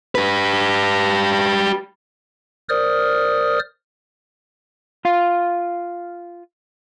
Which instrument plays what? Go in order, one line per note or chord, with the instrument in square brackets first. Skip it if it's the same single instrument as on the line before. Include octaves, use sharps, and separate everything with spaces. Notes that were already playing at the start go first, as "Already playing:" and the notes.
[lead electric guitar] G4 B4
[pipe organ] A#4 C5 D5 D#6 F6
[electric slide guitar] F4 F5